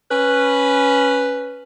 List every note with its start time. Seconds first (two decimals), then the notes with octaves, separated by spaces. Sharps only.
0.11 C#4 B4